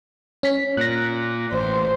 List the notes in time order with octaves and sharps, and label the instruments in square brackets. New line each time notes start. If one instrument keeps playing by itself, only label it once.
[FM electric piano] C#4 B6
[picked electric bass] A#2 [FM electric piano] F#6 A#6
[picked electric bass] A1 [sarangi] C5